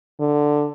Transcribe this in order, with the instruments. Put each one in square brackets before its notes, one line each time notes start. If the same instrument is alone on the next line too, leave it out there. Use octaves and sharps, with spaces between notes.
[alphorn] D3